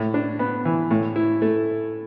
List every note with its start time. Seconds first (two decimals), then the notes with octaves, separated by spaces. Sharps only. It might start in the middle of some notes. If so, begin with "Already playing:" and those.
Already playing: A2
0.14 D4
0.39 B3
0.65 E3
0.91 A2
1.16 E4
1.42 A3